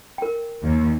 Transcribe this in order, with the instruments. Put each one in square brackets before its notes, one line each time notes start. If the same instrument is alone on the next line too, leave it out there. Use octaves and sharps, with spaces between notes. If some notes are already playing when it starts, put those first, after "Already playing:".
[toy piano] A#4 G5
[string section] D#2